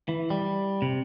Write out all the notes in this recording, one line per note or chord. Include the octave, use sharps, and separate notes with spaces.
E3
G3
C3